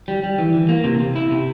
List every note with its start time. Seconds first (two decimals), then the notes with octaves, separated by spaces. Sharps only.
0.08 G3
0.24 G3
0.38 E3
0.54 E3
0.69 A#3
0.84 C3
1.00 C3
1.16 E4
1.31 C3